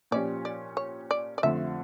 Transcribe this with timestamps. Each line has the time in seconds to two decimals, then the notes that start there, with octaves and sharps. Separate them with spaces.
0.11 A#2 F3 C#4 G4 D5
0.45 D5
0.77 C#5
1.11 D5
1.38 D5
1.43 F2 D3 F3 A3 E5